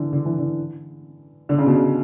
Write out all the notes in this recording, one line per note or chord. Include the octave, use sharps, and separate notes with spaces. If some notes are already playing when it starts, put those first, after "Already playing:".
Already playing: D3 E3
D3
E3
D3
D3
C#3
B2
C#3